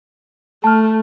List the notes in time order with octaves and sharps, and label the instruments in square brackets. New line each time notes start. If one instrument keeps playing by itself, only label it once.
[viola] A3 [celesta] A5 F6